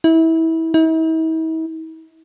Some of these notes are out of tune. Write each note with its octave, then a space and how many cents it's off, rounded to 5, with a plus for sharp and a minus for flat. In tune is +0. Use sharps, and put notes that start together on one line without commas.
E4 -25
E4 -45